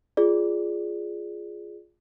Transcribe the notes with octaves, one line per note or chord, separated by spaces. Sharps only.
F4 G#4 D5